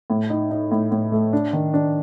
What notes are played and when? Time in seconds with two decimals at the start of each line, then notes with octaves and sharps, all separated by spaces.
0.10 A2
0.30 D#4
0.51 D#4
0.71 A2
0.92 A2
1.12 A3
1.33 D4
1.53 D#3
1.74 D4